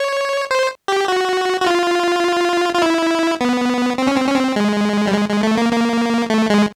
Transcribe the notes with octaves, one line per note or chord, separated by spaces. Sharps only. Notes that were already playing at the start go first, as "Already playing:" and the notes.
Already playing: C#5
C5
G4
F#4
F#4
F4
F4
E4
B3
C4
C#4
C4
C#4
C4
G#3
G3
G#3
G#3
A3
A#3
A#3
A3
G#3